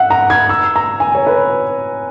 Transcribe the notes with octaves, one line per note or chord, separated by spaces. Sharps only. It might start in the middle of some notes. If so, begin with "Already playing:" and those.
Already playing: E5 F#5
A#5
G#6
E6
A#5
G#5
C#5
B4